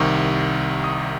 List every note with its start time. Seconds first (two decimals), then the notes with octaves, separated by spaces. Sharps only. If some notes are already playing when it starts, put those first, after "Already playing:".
Already playing: C2 C3 D#3 C#6
0.84 D#6